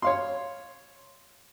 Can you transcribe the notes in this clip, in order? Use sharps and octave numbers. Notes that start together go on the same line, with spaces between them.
C#5 F5 C6